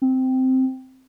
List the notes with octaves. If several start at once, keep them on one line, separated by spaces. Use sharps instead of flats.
C4